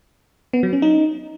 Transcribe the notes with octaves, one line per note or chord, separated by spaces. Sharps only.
B3
F#3
C#4
D#4